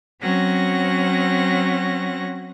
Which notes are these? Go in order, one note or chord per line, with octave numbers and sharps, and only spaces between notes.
F#3 C4 C#4 F#5 A#6